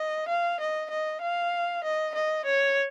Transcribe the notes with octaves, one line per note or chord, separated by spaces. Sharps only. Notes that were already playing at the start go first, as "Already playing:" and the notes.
Already playing: D#5
F5
D#5
D#5
F5
D#5
D#5
C#5